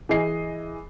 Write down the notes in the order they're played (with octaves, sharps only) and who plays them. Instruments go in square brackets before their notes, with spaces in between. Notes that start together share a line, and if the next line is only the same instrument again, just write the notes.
[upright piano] E3 G#4 D#5 C7